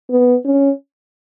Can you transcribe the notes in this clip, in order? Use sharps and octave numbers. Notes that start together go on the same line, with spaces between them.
B3
C#4